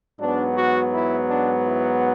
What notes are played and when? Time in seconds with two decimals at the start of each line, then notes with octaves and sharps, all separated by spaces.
0.19 G#2 F#3 B3 D4
0.55 F#4
0.91 E4
1.27 D4
1.64 E4